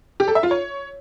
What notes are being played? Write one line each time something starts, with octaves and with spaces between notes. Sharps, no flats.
G4
A4
E5
F4
C#5